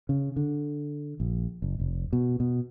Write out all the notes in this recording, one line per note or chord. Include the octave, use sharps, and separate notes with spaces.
C#3
D3
A#1
F#1
F1
B2
B2